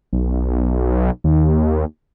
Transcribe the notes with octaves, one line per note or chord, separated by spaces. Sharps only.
B1
D#2